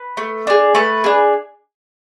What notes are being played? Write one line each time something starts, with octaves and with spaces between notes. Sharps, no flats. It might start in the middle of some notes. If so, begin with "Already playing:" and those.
Already playing: B4
A3
D4 G#4
A3 B4
D4 G#4